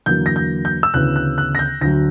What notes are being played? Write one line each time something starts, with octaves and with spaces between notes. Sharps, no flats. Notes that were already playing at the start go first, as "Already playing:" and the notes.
E2 D3 F#3 A#3 G6
A#6
G6
G6
E6
D2 C#3 E3 B3 F#6
F#6
F#6
A#6
G6
D2 D3 F#3 A#6